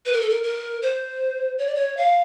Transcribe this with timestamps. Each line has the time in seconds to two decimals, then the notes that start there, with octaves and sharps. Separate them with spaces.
0.06 B4
0.13 A#4
0.21 A4
0.30 A#4
0.43 A#4
0.82 C5
1.58 C#5
1.67 D5
1.75 C#5
1.97 F5